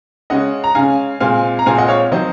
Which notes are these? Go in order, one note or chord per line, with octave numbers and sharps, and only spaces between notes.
C#3 G#3 C#4 D#5 F#5
A#5
C#3 G#3 C#4 F5 G#5
A#2 G#3 C4 F5 G#5
A#5
A#2 G#3 C4 F5 G#5
D#5 F#5
C#5 F5
D#3 F#3 C4 C5 D#5